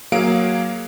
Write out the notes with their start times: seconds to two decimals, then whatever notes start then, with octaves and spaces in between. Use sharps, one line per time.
0.12 F#3 A#3 G#4 F5 D7